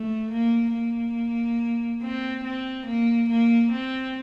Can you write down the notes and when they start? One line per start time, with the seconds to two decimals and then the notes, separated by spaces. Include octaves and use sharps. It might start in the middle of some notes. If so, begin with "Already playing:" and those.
Already playing: A3
0.31 A#3
0.73 A#3
2.02 C4
2.44 C4
2.86 A#3
3.29 A#3
3.72 C4